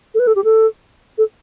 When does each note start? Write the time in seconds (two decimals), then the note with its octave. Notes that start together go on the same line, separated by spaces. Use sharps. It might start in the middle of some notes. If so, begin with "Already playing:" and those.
0.14 A4
0.19 B4
0.27 A4
0.36 G4
0.44 A4
1.18 A4